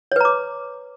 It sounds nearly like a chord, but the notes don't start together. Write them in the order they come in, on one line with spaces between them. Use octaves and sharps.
C#5 B4 A#5 D6